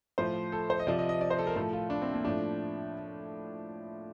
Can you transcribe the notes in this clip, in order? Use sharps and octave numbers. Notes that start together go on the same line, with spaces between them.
A2 F3 C5
A4
C5
D#5
C3 F3 D5
D#5
D#5
D5
C5
A4
A#4
A2 F3 A4
F4
D4
C4
A#3
A2 F3 D4